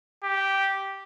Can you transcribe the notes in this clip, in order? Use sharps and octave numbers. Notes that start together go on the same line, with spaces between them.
G4